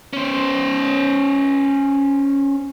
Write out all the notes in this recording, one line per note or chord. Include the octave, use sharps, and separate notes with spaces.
C#4 C5